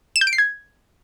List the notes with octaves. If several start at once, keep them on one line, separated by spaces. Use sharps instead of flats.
E7
G6
D7
C7
G#6